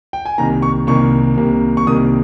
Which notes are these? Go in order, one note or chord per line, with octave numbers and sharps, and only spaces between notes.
G5
G#5
C2 C3 D#3 A#3 A#5
C#6
C2 C3 D#3 A#3 C#6
C2 C3 D#3 A#3
C#6
C2 C3 D#3 A#3 D#6